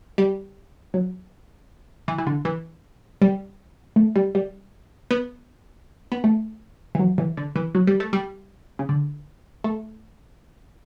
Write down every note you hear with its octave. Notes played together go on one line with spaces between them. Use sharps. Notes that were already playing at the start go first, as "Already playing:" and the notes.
G3
F#3
E3
E3
D3
E3
G3
A3
G3
G3
B3
B3
A3
E3
F#3
E3
D3
E3
F#3
G3
A3
G3
C#3
D3
A3